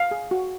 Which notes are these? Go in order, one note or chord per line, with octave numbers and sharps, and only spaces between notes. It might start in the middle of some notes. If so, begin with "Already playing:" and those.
Already playing: F5
G#4
F#4